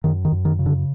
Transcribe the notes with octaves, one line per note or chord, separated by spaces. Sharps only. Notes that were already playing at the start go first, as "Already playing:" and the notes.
F#2 D#3
D#3
F#2
D#3
C#3
D3